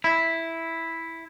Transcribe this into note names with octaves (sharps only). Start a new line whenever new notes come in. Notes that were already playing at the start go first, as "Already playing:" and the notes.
E4